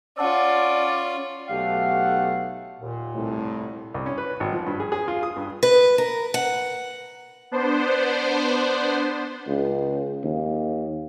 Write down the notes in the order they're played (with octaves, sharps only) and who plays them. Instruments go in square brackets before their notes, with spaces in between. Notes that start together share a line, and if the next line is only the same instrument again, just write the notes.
[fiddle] C#4 F4 [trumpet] D5 [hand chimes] F#5 A5 E6
[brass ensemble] B1 A3 F#5 [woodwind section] G4 F5
[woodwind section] D#2 A#2
[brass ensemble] C2 A2
[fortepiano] C2
C#4
B4
G#1
F3
G2
G#4
G#4
F4
D#6
G2
[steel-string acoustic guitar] B4
A#4
F#5
[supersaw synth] B3 D4 C5
[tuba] C#2
D#2